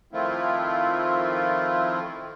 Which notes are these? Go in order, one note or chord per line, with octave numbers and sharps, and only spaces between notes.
D#3 F3 A3 C4 E4 F4